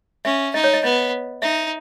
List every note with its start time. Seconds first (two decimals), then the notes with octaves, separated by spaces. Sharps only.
0.25 C#4 E5
0.54 D#4 D#5
0.64 C#5
0.73 D#5
0.84 B3 D#5
1.42 D#4 E5